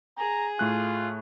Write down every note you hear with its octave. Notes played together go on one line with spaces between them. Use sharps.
G#4 A#5
A2 A3 F4 F#6